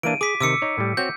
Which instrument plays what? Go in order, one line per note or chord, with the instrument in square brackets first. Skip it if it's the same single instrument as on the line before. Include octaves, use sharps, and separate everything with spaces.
[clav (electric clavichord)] E3 A#3 D4 [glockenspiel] D7 D#7
[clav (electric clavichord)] G#4 [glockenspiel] D6 B6
[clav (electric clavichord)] C3 D#3 [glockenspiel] D6 E6 C#7
[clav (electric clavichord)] D#4 C#5
A2 G3
[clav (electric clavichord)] C4 F#4 C#5 [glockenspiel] G6